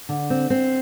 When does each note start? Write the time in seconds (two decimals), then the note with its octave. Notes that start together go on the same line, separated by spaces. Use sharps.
0.09 D3
0.30 C4
0.50 C4